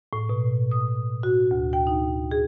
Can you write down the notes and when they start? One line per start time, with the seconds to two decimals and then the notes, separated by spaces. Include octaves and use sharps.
0.13 A2
0.29 B2
0.71 D#6
1.23 F#4
1.51 D2
1.73 G5
1.87 D#4
2.31 G#4